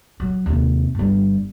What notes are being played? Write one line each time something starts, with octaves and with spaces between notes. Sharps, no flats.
F#3
D#2 C3
G1 G3